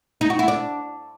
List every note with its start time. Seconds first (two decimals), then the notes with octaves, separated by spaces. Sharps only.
0.21 D#4
0.30 F#4
0.39 E4
0.48 D4